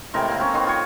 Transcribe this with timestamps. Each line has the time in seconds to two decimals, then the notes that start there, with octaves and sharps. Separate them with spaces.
0.14 A2 C3 G#3 A#4
0.28 A#3 C4
0.40 C#4 C#5 E5
0.53 D#3 B3 C4
0.67 F4 C#5